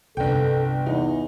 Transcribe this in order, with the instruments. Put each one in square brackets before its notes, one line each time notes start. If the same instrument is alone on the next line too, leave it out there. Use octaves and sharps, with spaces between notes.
[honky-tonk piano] G1 G5 [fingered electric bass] C2 C3 [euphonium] A4
[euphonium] E2 [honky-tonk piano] D#4